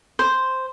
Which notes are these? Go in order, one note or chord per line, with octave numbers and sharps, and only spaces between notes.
C5